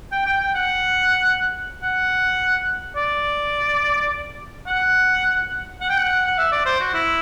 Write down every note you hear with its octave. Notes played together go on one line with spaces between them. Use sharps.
G5
G5
G5
F#5
F#5
D5
F#5
F#5
G5
F#5
F#5
E5
D5
C5
F#4
E4